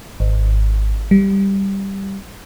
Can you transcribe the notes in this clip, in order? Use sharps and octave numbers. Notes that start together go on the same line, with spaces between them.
G#1
G3